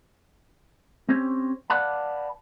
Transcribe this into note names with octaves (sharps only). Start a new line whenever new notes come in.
C4 C#4 G4 C5 C#5
B4 D5 F5 F#5 A5 B5